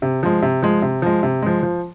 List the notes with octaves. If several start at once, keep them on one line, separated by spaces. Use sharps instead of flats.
C3
F3 G#3
C3
F3 G#3
C3
F3 G#3
C3
F3 G#3
F3